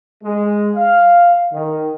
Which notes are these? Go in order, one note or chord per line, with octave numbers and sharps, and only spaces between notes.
G#3
F5
D#3